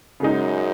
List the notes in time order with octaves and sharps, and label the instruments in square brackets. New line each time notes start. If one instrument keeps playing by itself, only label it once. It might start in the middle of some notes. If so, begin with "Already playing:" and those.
[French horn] F#2 [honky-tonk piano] C#3 G#3 D#4